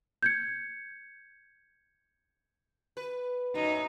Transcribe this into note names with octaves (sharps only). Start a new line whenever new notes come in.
G6 G#6 C#7
B4
F#2 F#3 D#4